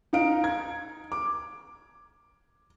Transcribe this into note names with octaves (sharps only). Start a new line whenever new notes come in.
D#4 F5 D7
G#6
D6